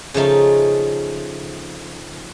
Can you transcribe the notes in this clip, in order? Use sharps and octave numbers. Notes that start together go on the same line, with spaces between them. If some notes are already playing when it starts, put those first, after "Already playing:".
C#3 F3 A3 D#4